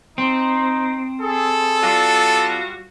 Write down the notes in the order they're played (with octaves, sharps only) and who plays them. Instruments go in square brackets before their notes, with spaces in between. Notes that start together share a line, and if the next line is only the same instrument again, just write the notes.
[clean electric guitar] C4 [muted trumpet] D#4
[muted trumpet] G#4 [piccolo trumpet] A4
[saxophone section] G3 F4 F#4 [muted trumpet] D5